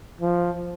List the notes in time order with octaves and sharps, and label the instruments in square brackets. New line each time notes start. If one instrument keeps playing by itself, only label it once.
[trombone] F3